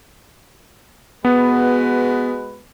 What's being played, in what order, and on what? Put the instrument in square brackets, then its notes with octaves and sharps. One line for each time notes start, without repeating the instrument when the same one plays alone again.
[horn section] G#3 F#4 B4 [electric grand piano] B3